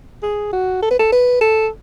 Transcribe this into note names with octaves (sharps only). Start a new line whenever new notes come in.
G#4
F#4
A4
B4
A4
B4
A4